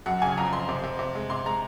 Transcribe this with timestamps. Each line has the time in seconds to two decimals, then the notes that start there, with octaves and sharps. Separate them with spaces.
0.06 F#2 F#5
0.22 C#3 G#5
0.37 F2 A#5
0.53 F2 C6
0.69 C3
0.83 C3
0.99 C3
1.15 G#3
1.30 C3 C6
1.46 G#3 A#5